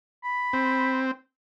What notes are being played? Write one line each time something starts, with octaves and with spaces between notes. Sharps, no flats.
B5
C4